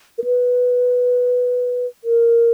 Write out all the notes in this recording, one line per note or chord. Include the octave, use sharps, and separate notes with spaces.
A#4
B4
A#4